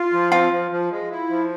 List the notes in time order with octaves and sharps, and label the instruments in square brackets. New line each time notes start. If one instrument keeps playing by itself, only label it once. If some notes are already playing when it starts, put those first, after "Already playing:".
Already playing: [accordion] F4
F3
[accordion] C4 [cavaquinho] F4
[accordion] F3
F3
G#3
E4
F3